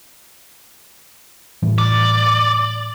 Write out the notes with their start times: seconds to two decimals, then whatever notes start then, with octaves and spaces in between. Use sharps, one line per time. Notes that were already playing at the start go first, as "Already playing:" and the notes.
1.63 A2 E3 G3
1.78 D5